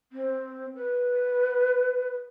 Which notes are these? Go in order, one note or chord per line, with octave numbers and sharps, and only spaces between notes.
C4
B4